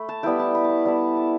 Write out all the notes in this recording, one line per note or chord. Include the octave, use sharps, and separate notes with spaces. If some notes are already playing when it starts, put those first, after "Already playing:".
Already playing: A3 B5
A5
G3 B3 E4 G5
A5
B5
A5
B5
G3 B3 E4 A5
A5